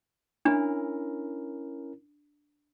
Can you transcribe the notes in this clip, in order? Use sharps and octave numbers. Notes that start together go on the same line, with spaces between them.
C#4 D4 E4 A#4